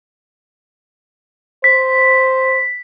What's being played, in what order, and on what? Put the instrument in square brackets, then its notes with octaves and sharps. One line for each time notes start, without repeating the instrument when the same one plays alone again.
[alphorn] C5 [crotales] B6